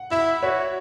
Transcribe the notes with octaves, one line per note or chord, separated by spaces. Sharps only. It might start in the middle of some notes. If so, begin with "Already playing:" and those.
Already playing: F#5
E4 E5
F#4 C#5